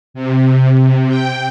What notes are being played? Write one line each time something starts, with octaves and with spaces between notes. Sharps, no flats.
C3
G5